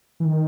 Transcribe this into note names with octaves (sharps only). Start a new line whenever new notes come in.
E3
D#3